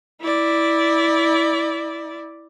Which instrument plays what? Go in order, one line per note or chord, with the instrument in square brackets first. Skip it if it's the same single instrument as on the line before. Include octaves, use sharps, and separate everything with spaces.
[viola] E4 D5